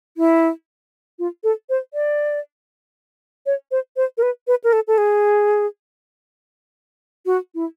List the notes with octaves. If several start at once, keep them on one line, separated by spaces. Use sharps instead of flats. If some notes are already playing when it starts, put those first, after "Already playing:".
E4
F4
A4
C5
D5
C#5
C5
C5
A#4
B4
B4
A#4
A4
A4
G#4
F#4
E4